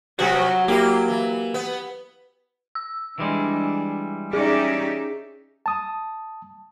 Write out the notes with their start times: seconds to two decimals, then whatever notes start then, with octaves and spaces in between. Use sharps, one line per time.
0.19 C3 F3 F#3 B3 F#4
0.68 A#3 E4 G4
1.08 E3
1.54 B3
2.75 E6
3.19 E3 G3 G#3 D4
4.33 C#4 D#4 G4 G#4 D5 E5
5.66 A5 D#6